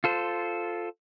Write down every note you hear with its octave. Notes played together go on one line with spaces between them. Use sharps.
F4 A4 C5